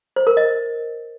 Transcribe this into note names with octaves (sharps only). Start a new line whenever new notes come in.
C5
A#4
D#5